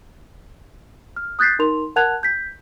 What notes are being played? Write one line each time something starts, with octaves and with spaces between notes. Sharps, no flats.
F6
D#6 F#6 G6 A6 B6 C7
D#4 A#4 C6 F7
A#4 F#5 A5 F#6 G#6 F7
G6 B6